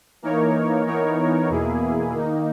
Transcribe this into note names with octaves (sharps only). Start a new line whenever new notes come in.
E3 A#3 D#4 A#4 C#5
E3 B3 D#4 A#4 C#5
E2 B2 A#3 E4 G#4
D#3 A#3 D#4